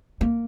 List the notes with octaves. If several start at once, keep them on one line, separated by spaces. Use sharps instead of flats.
A#3